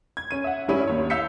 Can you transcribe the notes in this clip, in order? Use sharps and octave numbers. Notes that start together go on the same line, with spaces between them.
G#6
C#4 D#7
E5 F#5
G2 G3 C#4 E4
D#2 C#5
F5 E6 G6 B6 C#7